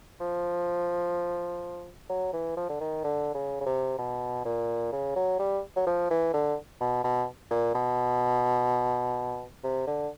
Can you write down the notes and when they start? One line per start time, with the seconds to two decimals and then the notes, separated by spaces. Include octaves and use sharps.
0.21 F3
2.09 F#3
2.33 E3
2.57 F3
2.69 D3
2.80 D#3
3.04 D3
3.35 C#3
3.61 C#3
3.66 C3
3.98 B2
4.45 A#2
4.93 C#3
5.16 F#3
5.39 G3
5.76 F#3
5.87 F3
6.11 E3
6.34 D3
6.81 B2
7.04 B2
7.51 A#2
7.75 B2
9.64 C3
9.87 D3